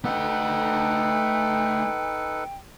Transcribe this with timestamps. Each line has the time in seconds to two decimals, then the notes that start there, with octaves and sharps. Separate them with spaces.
0.04 A3 D#4 A4 B4 F#5 G5